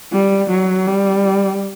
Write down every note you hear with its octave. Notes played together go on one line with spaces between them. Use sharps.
G3
F#3
G3